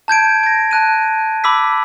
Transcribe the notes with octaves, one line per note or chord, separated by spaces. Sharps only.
A5 G6 G#6 D7
G#6 A#6
A5 F#6 D#7
B5 D6 E6 B6